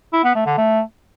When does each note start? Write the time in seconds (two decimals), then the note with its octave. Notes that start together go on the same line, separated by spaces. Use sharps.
0.13 E4
0.24 B3
0.35 A3
0.46 D3
0.58 A3